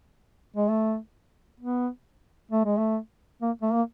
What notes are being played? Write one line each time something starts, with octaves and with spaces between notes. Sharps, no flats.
G#3
A3
B3
A3
G#3
A3
A#3
A3
A#3